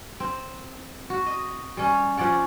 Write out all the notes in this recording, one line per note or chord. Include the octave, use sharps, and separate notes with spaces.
C4
F#4
D#5
G3 C#4
F3 C#4 D5 F#5